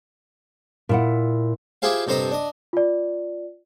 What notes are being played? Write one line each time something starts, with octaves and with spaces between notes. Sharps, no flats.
A#2 E4 F#5
E4 F4 G4 G#4 C5 F5
G2 C3 A4 C5 D#5 A#5
D4 D#5
F4 D5